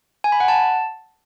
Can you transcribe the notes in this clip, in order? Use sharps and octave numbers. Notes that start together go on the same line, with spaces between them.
G#5
B5
F#5
A5